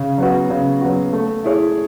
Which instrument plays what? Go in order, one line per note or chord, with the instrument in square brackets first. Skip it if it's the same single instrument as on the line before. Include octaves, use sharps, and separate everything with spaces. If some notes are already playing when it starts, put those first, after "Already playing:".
Already playing: [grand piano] C#3
F#3 B3 F#4
C#3
F#3 B3 F#4
A3
E4 G#4 C#5